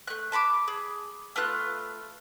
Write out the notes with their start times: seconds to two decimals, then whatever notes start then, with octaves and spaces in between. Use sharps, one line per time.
0.07 A3 F#6
0.32 A5 B5 C#6 D6
0.68 G#4
1.36 A3 B3 F4 F#6